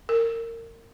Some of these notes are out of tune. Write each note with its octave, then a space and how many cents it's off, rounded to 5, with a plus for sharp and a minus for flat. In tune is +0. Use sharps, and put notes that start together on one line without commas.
A#4 -25